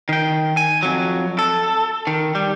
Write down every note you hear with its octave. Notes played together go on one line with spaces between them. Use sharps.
D#3 G5
G#5
F2 F#3
A4
D#3
G3